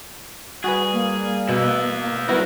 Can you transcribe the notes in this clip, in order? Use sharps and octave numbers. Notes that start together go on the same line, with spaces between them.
G3 F#4 G#4 B4 G#5
A#3
B2 B3 E4
G3 B3 E4 F#4 A#4 B4